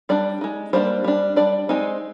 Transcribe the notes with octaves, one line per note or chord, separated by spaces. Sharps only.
G3 D4 D5
G#3 D#4
G3 A#3 D4 C5
G3 D4
G3 D4 D5
G#3 C4 D#4